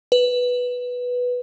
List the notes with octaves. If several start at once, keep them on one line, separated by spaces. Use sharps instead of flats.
B4